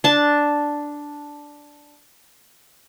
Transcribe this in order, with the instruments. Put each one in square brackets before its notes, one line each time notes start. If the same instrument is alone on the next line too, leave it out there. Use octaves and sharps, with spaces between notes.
[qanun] D4 A5